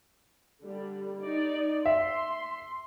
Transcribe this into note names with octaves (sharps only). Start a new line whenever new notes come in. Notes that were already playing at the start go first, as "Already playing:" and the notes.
D3 G3
D#4 D5
E5 C6